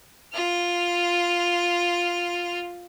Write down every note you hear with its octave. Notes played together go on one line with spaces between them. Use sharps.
F4 F6